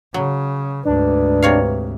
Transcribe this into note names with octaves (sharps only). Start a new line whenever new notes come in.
C#3 F#3
D2 G#2 D4 B4
C3 C#5 F5